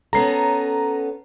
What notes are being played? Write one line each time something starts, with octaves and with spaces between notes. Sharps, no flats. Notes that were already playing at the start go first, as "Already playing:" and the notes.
B3 C#4 A4 A#5 C7